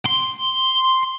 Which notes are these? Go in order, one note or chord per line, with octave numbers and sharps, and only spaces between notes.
C6